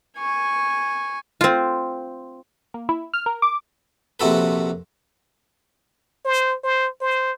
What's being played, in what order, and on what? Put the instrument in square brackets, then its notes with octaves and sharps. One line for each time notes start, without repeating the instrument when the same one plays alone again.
[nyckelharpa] G#5 C#6
[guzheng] C4 F4
[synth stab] A#3
E4
F6
A#4
D6
[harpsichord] A#1 C3 F#4 A4 B4
[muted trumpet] C5
C5
C5